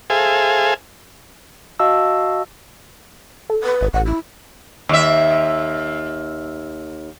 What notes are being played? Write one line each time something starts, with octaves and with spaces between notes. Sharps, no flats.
G#4 A4 C5 E5 F5 G#5
F#4 D#5 F5 A5 E6
A4
B4
G#1
A1 F#5
E4
D#2 E5